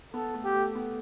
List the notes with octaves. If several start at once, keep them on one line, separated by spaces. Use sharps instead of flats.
B3 A4
A3
G4
A3
B3